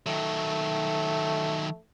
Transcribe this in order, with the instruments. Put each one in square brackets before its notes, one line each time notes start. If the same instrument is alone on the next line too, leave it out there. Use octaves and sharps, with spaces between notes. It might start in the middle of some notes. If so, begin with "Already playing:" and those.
[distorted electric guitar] D#3 F#3 [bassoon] A3